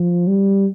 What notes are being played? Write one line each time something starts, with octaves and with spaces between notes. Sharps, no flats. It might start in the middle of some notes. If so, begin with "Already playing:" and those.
Already playing: F3
G3